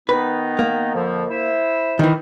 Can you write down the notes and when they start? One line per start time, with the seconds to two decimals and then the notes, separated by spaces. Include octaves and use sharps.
0.09 D#3 B3 D#4 B4
0.59 A#3
0.94 F2 D3 F3
1.30 E4 C5 E5
1.99 D#3 E3